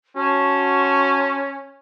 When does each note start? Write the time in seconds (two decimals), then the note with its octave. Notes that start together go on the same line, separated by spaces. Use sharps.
0.17 C#4 F#4 A5 C6 C#6